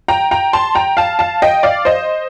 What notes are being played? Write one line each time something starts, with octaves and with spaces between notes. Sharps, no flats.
G5 A#5
G5 A#5
A5 C6
G5 A#5
F5 A5
F5 A5
D#5 G5
D5 F5
C5 D#5